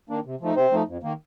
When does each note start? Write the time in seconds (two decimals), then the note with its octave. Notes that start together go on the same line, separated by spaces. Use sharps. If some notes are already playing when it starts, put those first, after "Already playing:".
0.10 D#3 A#3 D4
0.25 C3
0.41 F3 A3 D#4
0.56 C3 C4 C5
0.72 F3 A3 D#4
0.87 F2
1.03 D#3 A#3